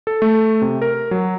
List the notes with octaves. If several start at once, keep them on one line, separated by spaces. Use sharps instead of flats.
A4
A3
C3
A#4
F#3